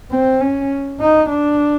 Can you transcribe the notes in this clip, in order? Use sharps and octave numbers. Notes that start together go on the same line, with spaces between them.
C4
C#4
D#4
D4